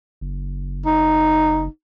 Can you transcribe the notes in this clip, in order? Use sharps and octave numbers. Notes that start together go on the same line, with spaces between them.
F#1
D#4